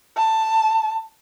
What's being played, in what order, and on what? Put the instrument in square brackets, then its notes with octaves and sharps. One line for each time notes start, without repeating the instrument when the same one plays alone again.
[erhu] A5